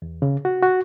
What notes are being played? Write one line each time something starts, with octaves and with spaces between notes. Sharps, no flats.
E2
C#3
F#4
F#4